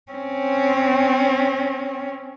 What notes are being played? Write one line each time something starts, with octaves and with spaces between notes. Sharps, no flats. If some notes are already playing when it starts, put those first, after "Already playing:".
C4 C#4